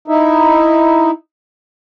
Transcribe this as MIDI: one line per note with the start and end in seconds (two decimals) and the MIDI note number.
0.08 1.11 63
0.08 1.11 64